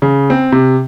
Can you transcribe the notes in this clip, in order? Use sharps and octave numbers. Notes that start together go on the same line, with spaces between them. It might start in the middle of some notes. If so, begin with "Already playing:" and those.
C#3
C4
C3